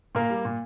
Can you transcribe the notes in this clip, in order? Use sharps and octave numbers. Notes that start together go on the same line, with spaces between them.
A#2 A#3 A#4
G3
A#2